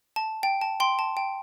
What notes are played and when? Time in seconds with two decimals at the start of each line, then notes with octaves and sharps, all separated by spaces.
0.16 A5
0.43 G5
0.61 A5
0.80 G5 C6
0.99 A5
1.17 G5